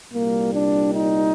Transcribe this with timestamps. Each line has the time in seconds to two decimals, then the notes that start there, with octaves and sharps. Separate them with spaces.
0.11 C2 A#2 G3 A#3
0.52 D4
0.92 D#4